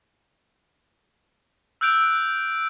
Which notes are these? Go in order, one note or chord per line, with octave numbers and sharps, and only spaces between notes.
E6 F#6 G6 D7 F7